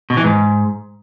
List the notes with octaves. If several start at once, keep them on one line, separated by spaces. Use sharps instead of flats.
B2
E3
G#2